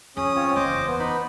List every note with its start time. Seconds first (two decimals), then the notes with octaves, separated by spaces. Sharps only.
0.17 F2 C#4 G#4 D#6
0.35 C4 F4 C#5
0.56 F#1 E2 C5 D#5 D6
0.87 B3 C5
1.00 D#4 B5